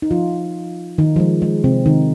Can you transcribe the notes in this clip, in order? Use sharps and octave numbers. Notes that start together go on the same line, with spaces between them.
D#4
F3 F4
D#3 D#4
F3
G#3
G#3
C3 C4
D#3 D#4